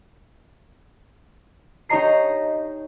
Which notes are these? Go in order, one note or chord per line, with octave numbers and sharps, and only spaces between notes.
D#4 G4 C#5 D#5 A#5 C7